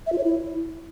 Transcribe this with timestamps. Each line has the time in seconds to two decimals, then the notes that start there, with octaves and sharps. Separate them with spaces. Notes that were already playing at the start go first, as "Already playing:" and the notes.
0.06 E5
0.12 F4
0.18 C#5
0.24 E4